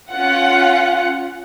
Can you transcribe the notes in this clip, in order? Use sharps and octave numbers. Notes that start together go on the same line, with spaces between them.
C#4 F4 F#5